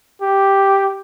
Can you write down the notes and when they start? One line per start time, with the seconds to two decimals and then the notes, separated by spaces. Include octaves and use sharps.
0.22 G4